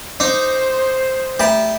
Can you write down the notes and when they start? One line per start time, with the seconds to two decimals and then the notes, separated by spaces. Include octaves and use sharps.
0.20 D#4 C5 D6
1.40 A3 G4 E5 B5